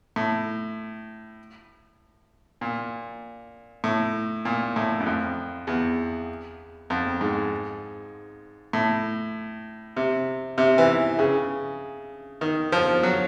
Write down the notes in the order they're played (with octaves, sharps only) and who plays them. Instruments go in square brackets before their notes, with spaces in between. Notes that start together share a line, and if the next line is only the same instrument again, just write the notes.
[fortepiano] A2
A#2
A2
A#2
A2
F#2
F2
E2
F2
G#2
A2
C3
C3
E3
C#3
D#3
F3
F#3